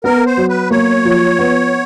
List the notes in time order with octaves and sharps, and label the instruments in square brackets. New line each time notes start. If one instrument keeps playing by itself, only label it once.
[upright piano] B3 [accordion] A#4
[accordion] C5
[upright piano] F#3
[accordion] B4
[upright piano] A#3 [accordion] C#5
[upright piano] F3
B3